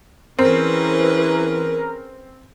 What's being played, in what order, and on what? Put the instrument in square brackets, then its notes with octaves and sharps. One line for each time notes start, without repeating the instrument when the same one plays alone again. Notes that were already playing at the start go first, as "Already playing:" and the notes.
[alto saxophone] E3 [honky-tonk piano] C4 [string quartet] C#4 G#4 B4 [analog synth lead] A#4